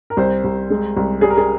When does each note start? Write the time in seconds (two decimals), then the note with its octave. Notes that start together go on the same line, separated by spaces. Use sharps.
0.10 A#4
0.17 C2 C5
0.44 C2
0.70 G#3
0.96 C2
1.21 G3 G#4
1.30 A#4
1.37 G#4